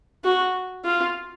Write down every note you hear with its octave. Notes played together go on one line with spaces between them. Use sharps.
F#4
F4